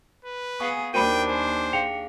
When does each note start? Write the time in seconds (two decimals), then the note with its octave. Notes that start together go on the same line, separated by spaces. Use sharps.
0.25 B4
0.60 B3 G#4 F5 G#5 C#6
0.94 D#2 D4 F#4 A#4 C5 G5 B5 D#7
1.29 C5 G#5
1.73 G#4 F5 G5 C#7 F7